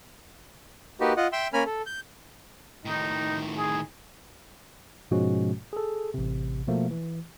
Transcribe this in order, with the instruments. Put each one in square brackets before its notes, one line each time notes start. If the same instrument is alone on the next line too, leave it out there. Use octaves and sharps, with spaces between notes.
[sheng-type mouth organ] A#3 D#4 F#4 G4 B4
F4 D#5 F#5
E5 G5 C6 E6
A#3 C#4 A#4 G#5 B5 F6
A4
G6
[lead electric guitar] A2 D#3 [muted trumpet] D#4
[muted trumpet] G#4
[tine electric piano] G#2 B2 F3 G#3 C#4 F#4
G#4 A4
A1 C3
B2 F3 A3 A#3
E3